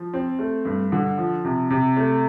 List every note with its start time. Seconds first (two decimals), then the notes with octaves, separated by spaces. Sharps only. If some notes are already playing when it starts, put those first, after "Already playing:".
Already playing: F3
0.14 C4
0.39 A3
0.65 G2
0.92 D3
1.18 F3
1.45 C3
1.70 C3
1.97 A3